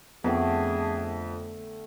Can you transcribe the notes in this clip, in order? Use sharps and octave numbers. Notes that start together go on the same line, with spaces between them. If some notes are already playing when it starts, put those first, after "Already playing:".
F2 D3 A3 B3 G#4 G5